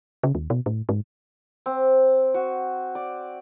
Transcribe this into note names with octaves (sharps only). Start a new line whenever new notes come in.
C#3
D#2
B2
A2
G#2
C4
F#4
D5